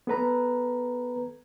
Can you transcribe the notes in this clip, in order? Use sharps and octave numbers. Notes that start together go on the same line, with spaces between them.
B3 A4 B4 A#5